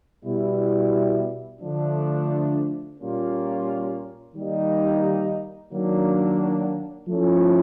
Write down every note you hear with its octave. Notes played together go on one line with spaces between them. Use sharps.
B2 G3 B3 E4
D3 F3 A3 D4
A#2 G3 A#3 C#4 F4
D#3 G3 A#3 D#4
D#3 F#3 A#3 D4
F3 A3 C#4 E4